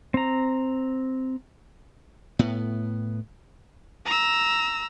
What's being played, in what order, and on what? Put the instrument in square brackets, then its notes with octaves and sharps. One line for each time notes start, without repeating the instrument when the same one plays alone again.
[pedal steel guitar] C4 A#5
[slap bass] A2 B3
[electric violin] A#5 E6